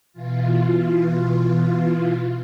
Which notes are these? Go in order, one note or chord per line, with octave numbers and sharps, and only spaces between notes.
B2 E3 F4